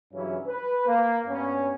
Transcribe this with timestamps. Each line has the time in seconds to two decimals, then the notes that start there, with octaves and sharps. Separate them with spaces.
0.13 G2 C#3 E3 F#3 C#4 E4
0.46 B4
0.87 A#3
1.27 G2 B3 C#4